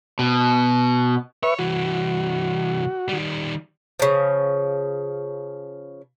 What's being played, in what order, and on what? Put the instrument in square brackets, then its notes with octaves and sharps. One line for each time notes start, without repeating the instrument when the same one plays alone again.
[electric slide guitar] B2
[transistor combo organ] B4 E5 C#6 [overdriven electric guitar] C#5
[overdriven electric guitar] C2 E3 [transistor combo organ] F#4
[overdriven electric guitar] D#3 G3
[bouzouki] C#3 F3